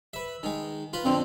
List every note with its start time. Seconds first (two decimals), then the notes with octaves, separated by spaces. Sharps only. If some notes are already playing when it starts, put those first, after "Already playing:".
0.13 B4 E5
0.43 D#3 G#3
0.93 F4 B4
1.05 F2 D3 F3 C4